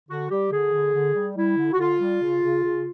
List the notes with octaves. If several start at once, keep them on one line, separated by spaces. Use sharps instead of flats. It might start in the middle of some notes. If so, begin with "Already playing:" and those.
D3 F#4
G3 G4
D3 G#4
D3
D3
G3
G3 E4
D3
F#4
D3 F4
G3
C#3
C#3
C#3